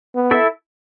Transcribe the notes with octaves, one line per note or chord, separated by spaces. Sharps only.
B3
E4 A4 E5